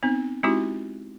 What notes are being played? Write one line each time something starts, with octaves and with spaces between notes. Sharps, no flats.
B3 C4 D#4
G#3 C4 D#4 E4 F#4 G4